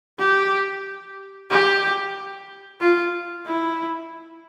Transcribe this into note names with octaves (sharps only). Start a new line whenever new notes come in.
G4
G4
F4
E4